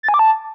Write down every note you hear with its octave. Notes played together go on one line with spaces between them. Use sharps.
A6
G#5
D6
A5